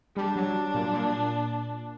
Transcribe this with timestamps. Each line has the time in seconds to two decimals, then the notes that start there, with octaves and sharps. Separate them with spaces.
0.17 G3 D4
0.36 F#3
0.74 A#2
0.93 A#2